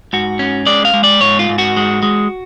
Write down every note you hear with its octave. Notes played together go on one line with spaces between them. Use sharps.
G#2 F#4
C#4
G#3 D5
F5
G#3
D5
G#2 C#5
F4
G#2
F#4
G#3
G#3